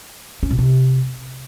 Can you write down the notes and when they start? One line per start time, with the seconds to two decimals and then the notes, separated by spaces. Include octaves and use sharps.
0.43 C#4
0.51 B2
0.58 C3